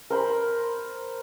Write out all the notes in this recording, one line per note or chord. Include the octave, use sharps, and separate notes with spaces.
A#4 C5 B5